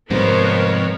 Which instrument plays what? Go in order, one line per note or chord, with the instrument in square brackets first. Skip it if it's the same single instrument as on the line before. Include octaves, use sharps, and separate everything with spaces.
[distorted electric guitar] F2 [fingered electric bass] G#2 C3 G3 [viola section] B3 A#4 C#5 [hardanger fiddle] C5